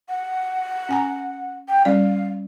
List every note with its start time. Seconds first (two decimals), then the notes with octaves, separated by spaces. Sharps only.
0.09 F#5
0.89 C#4 G#5 A#5
1.69 G5
1.85 G3 C#4 D5 F5